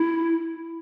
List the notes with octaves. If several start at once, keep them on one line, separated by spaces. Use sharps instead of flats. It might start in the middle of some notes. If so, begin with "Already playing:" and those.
Already playing: E4